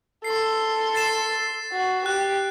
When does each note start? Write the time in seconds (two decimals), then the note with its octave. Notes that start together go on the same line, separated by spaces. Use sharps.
0.24 A4 C6 C7
0.95 A6 C7 E7
1.72 F#4
2.06 G4 F#6